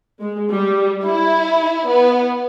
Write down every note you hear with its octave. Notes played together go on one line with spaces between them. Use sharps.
G#3
G3
E4
B3